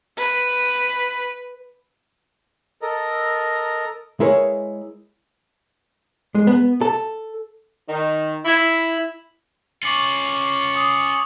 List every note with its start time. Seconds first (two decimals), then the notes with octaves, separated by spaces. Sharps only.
0.18 B4
2.82 A4 A#4 D#5 A#5
4.20 G#3 E4 G#4 A#4 B4 C#5
6.35 G#3
6.47 B3
6.81 A4
7.89 D#3
8.45 E4
9.83 C#4 F4 C#6 D6 F#7
10.76 D6 D#6